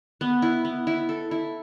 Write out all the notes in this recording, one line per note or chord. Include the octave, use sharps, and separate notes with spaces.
B3
E4
B3
E4
A4
E4